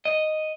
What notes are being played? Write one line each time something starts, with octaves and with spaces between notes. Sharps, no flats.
D#5